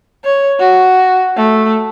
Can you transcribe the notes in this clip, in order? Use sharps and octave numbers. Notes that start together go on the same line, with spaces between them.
C#5
F#4
A3